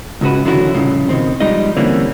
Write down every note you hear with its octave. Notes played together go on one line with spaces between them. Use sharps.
C#2 G#2 C#3 F#4 B4
D3 D#3 F3 C#4 E4 F#4
C2 F2 A2 C#3
B2 D#3 C4
F3 G3 G#3 D#4 D#5
D3 E3 G3 A#3 C4 C#4